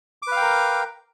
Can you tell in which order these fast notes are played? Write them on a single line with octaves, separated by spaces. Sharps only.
D6 B4 F5 G5 A#4